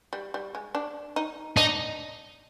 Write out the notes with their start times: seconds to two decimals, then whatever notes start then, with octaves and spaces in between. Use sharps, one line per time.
0.13 G3
0.34 G3
0.55 G#3
0.75 D4
1.16 D#4
1.57 D4 D#4